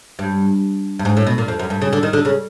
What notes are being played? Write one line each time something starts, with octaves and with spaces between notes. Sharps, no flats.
G2
G2
G#2
A2
B2
A#2
F2
F#2
G2
C#3
D3
D#3
D3
C#3